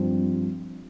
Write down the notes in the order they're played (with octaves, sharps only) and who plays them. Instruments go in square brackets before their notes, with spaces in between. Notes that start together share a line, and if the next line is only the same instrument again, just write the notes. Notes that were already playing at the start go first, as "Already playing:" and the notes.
Already playing: [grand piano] G2 F3 C4